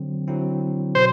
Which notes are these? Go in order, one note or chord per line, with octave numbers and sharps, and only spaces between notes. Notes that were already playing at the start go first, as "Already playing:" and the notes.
Already playing: D3 F#3 C4
D3 F#3 C4 E4
B2 F#3 C5